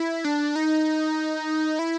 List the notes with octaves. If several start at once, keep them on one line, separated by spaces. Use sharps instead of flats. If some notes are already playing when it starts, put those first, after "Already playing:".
Already playing: E4
D4
D#4
E4